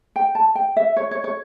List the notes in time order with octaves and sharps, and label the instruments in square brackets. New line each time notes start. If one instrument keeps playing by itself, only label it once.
[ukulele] G5
A5
G5
E5
C#5
C#5
C#5